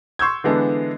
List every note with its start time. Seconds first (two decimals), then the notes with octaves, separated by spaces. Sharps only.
0.19 C6 C#6 E6 G6 G#6
0.44 D3 E3 G#3 B3 D4 A4